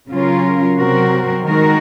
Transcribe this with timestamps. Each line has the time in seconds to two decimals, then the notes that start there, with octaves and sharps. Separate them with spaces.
0.11 C#3 F#3 C#4 F4 A#4
0.77 C3 F#3 C4 F#4 A#4
1.44 D#3 G#3 D#4 F#4 A#4